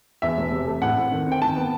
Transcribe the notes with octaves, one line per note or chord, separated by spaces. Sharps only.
E2 E5
E1
C3
A3
A2 F#5
C4
D#3
C4 G5
D#3 A5
B3